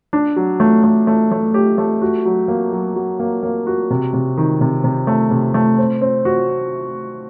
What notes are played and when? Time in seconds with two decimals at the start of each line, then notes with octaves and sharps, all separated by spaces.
0.13 D4
0.36 F#3
0.60 A3
0.84 A3
1.07 A3
1.31 A3
1.54 G4
1.78 A3
2.02 F#4
2.25 F#3
2.48 A#3
2.72 F#3
2.96 F#3
3.19 A#3
3.43 A#3
3.67 F#4
3.91 C3
4.13 C3
4.37 D#3
4.61 C3
4.84 C3
5.07 A3
5.31 C3
5.54 A3
5.78 C4
6.02 C4
6.25 F#4